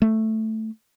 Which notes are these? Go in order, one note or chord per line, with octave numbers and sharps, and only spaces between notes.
A3